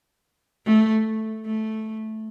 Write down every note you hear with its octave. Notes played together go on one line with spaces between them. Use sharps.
A3
A3